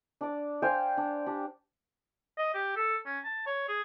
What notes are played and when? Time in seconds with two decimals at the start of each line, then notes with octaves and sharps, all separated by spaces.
0.21 D4 D5
0.62 C5 F5 G5 G#5
0.97 D4
1.26 D4 G4
2.38 D#5
2.54 G4
2.76 A4
3.06 C#4
3.24 A5
3.46 C#5
3.68 G#4